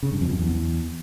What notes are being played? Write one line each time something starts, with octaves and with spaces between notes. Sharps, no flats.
C#3
G2
F2
F#2
E2